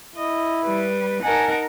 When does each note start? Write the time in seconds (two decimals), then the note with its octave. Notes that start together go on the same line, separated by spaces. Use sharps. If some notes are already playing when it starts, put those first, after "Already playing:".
0.16 E4 D#5
0.64 G3 B4
1.23 D#4 A#4 F#5 G#5 A5